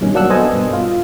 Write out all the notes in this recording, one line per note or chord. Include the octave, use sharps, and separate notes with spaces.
G2 B2 D#3 C#4
F#3 A#3 D4 F#5 E6 F#6
B3 A4 C5 D#5 G#5
G2 B2
F4